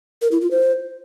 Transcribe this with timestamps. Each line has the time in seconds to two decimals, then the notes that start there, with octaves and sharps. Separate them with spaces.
0.22 A#4
0.32 E4
0.41 F4
0.51 C5